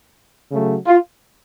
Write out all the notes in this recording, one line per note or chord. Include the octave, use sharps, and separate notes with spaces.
C#3 F#3 A3
F4